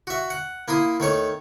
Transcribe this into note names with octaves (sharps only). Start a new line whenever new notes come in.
F#4 E5
F#5
A#3 E4 C6 D#6
D#3 A3 C#5 C#6